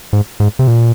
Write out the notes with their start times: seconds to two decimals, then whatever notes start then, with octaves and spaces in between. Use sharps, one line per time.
0.13 G#2
0.40 G#2
0.59 C3
0.67 A#2